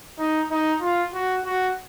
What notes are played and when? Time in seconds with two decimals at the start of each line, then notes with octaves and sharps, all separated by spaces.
0.19 D#4
0.51 D#4
0.82 F4
1.14 F#4
1.45 F#4